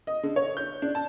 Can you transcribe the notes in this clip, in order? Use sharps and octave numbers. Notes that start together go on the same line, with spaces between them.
D#5
D3
C#5
G6
D4
A5